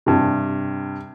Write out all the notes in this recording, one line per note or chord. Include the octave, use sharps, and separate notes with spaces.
G2 C3